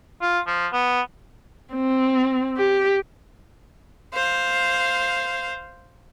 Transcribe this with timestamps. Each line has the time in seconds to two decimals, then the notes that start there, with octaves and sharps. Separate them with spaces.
0.21 F4
0.47 F3
0.73 B3
1.74 C4
2.58 G4
4.13 C5 F5